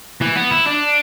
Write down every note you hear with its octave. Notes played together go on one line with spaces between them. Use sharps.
E3
B3
E4
D4